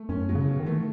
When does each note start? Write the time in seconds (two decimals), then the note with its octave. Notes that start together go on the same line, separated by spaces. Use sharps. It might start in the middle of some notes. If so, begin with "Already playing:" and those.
Already playing: A3
0.09 F#2 C#4
0.29 F#3
0.35 C#3
0.48 B2
0.60 D#3
0.66 E3 A3
0.74 D#3